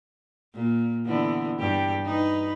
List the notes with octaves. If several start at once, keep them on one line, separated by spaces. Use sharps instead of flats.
A#2
D3 E3 B3
G2 G4
D#4 B4